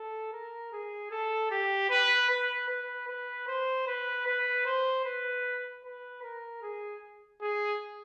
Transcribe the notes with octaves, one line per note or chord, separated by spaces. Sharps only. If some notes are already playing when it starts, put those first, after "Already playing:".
Already playing: A4
A#4
G#4
A4
G4
B4
B4
B4
B4
C5
B4
B4
C5
B4
B4
A#4
G#4
G#4